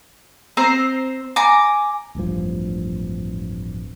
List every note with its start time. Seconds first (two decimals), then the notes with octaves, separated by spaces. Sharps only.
0.57 C4 C5 A#5
1.36 G#5 A#5 D6
2.15 D1 A1 G2 F3